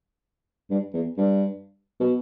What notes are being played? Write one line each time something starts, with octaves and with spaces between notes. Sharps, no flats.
G2
E2
G2
B2